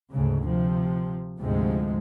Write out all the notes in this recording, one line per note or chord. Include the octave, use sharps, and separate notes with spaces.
D2 G#2 C#3
C3 F3
D2 G#2 C3 F3 G#3